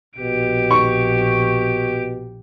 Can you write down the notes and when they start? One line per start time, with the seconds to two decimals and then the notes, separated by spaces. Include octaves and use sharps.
0.18 A#1 B2 G4 D7
0.71 C#6